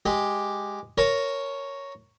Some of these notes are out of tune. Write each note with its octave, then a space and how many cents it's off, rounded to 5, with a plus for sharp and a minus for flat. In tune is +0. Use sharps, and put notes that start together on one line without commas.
G#3 -5 G4 +0
A#4 +0 C#5 +0 A5 -35